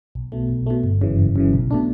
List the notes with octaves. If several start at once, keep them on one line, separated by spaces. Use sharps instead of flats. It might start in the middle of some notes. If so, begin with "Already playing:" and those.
B1
B2 A3
B1
B2 A3
G1
F#2 C#3 E3
G1
F#2 C#3 E3
B1
B2 A3 D4